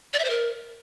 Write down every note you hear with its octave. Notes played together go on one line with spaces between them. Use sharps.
D5
E5
C5
A#4